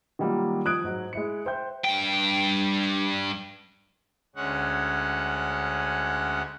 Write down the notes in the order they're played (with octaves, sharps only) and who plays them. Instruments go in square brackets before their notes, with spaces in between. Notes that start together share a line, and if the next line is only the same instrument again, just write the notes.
[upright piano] D#3 F#3 G3 A#3 F4 F#4
F3 D#6 F#6 G#6 D7
G#2 F#3
G#3 E4 C#7
C5 E5 G5 G6
[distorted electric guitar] G2 G5
[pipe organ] D2 G#3 C#4 F#5